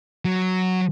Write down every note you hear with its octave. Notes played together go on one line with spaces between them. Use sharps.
F#3